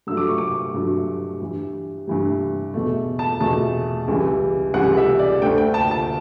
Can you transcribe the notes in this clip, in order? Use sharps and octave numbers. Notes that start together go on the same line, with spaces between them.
G2 F#3 A3 E6
D6
C#6
D6
G2 F#3 A3
G2 E3 G3
G2 E3 G3
E2 B2 A3
A5
E2 B2 A3 A5
C#2 C#3 E3 G3
C#2 C#3 E3 G3 F#5
E5
D5
D2 D3 A3 G5
G5
A5
A5